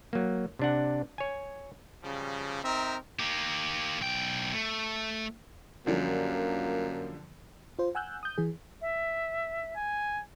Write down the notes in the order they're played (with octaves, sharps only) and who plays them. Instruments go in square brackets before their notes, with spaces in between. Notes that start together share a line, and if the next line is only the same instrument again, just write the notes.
[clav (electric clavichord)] F#3 A#3
C3 D4 F#5
C#5 G#5
[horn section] C#3 F3 G3
C4 D#4 A#4 E5
[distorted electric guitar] A#3 G4
B1 G5
A3
[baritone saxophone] F#2 [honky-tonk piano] D3 F3 G3 [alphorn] A#3
[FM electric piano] F4 C5
F#5 G#5 E6 F#6 G6
D#6 G6
E3 G#4
[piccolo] E5
[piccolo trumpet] G#5